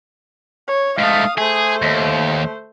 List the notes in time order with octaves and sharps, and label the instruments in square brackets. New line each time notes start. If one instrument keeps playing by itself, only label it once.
[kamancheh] C#5
[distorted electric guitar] G#2 A3 [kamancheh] F5 D#6
[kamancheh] A3 C5 [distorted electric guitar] G#4
[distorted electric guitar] D#2